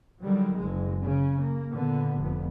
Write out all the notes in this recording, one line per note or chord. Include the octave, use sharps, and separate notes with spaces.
D3 D#3 F#3 G3
F#1 G#3
C#3 C#4
A#3
A#2 D3 B3
F1 F2 B3